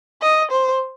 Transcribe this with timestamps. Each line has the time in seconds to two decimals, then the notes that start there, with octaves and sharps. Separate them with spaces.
0.22 D#5
0.51 C5